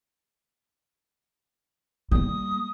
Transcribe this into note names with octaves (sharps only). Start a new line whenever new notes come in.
G3 A#3 D#6